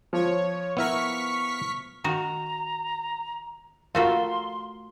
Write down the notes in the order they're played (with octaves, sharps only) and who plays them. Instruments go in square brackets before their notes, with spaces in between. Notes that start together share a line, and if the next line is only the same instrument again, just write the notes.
[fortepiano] F3 [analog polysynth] C#5
[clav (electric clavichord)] B3 E4 A#4 [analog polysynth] C#6 F6 B6
[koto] D#3 F#4 [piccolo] A#5
[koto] A3 F#4 A4 [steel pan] F4 A#4 F5 [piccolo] C6